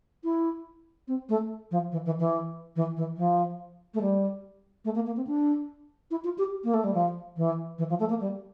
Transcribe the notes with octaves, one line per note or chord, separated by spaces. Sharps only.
E4
C4
A3
F3
E3
E3
E3
E3
E3
F3
A3
G3
A3
A#3
A#3
C4
D4
E4
F4
G4
A#3
A3
G3
F3
E3
E3
F3
A3
A#3
G3